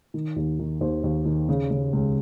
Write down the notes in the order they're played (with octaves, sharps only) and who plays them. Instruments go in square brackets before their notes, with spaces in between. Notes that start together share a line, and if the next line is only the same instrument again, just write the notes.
[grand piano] D#3
D#2
D#3
D#2 C5
D#2
D#3
C#3
C#3
C#2